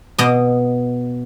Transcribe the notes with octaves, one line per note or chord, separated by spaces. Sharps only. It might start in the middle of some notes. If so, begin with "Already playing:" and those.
B2 D#5